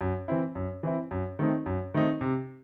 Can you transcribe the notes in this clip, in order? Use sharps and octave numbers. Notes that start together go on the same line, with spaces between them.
F#2
E3 C4 E4
F#2
E3 C4 E4
F#2
D#3 A3 C4 D#4
F#2
D#3 A3 C4 D#4
C3